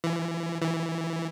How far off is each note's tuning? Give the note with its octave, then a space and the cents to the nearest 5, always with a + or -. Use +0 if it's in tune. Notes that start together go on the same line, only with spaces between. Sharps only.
E3 +25
E3 +0